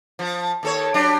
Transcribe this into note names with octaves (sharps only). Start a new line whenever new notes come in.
F3
D#2 A4 C#5
F#3 D4 G4